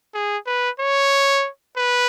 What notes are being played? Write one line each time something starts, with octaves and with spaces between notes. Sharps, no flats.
G#4
B4
C#5
B4